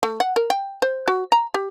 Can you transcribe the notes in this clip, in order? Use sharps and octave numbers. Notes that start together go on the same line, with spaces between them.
A3
F#5
A#4
G5
C5
F#4
A#5
G4